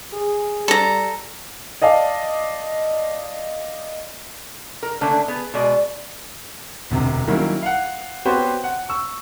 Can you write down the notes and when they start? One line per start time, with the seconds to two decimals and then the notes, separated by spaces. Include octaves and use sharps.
0.13 G#4
0.68 G3 A4 A#5
1.82 D5 D#5 F5 A5
4.83 A#4
5.01 D3 A3 A#3 C#4 D4
5.28 B3 G#4 B4
5.54 B2 G#3 D5
6.91 E1 D2 C3
7.27 D#3 F#3 G3 A#3 C#4 E4
7.62 F5 F#5
8.25 B3 C4 F#4 G4 C5 C#5
8.64 F#5
8.89 C#6 E6